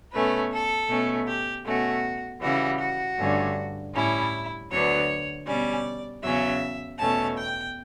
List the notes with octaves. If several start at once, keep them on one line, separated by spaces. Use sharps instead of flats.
B2 A3 C#4 B4
A4
B2 A3 C#4
G4
B2 A3 C#4 F#4
C#3 E3 G3 F#4
F#4
G2 D3 A3 C#4
A2 G3 C#4 E4
D2 D3 F#3 B3 C#5
B2 G3 C#4 D5
E2 C#3 F#3 C#4 E5
E2 B2 A3 C#4 A5
G5